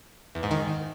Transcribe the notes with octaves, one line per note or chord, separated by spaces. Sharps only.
E2
G#2
D#3